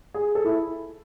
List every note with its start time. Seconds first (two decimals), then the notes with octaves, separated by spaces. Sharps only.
0.14 G#4
0.35 A4
0.45 E4